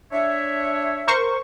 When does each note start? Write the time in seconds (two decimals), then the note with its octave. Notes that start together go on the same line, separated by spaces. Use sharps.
0.13 D4 C#5 E5
1.07 A#4 C5 C#6